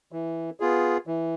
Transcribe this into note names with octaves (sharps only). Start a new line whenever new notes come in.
E3
B3 F4 G#4
E3